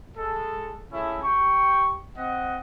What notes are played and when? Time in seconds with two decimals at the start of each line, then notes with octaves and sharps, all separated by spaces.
0.16 G#3 A4
0.92 G#3 A3 C#4 E4
1.23 G4 G5 C#6
2.16 C4 D#5 F#5